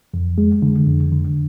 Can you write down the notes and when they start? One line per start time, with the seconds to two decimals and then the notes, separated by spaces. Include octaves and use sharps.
0.14 F2
0.38 G#3
0.62 D3
0.87 F2
1.12 D3